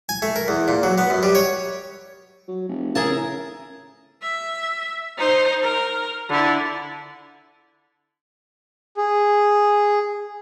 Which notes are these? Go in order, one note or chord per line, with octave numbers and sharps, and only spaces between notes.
G#5
A3
A#4
E2
A#2
F#3
B3
F#2
G3
C#5
F#3
F1
C#3 E4 G#4 A#4 A5
E5
D#4 C5
A#4
D3 E4
G#4